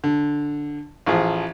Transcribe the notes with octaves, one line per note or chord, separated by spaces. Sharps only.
D3
A1 F3 G#4